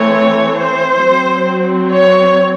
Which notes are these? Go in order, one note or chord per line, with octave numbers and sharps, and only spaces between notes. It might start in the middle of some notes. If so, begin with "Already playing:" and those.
Already playing: E3 A3 C4 C#5
C5
F#3 C4
C#5